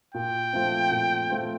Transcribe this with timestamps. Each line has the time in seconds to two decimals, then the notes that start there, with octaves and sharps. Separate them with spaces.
0.14 A#2 G5
0.53 F3 A3 C4 F4
0.91 A#2
1.30 F3 A3 C4 F4